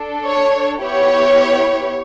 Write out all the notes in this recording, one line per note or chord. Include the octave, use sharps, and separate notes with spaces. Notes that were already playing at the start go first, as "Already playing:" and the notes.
Already playing: D4 A4
C#5
B3 E4 G4 C#5